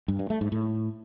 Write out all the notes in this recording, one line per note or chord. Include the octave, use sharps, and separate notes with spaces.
G2
G2
A3
G#2
A2